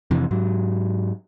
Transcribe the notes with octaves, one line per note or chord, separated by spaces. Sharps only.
F2 C3 E3
G#2 F#3